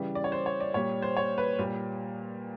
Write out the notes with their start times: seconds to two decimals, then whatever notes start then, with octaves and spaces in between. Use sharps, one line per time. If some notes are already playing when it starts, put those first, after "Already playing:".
Already playing: C#3 E3 G3
0.15 D5
0.24 C#5
0.32 C5
0.46 C#5
0.60 D5
0.74 A#2 G3 C#5
1.02 C5
1.17 C#5
1.38 B4
1.59 A#2 G3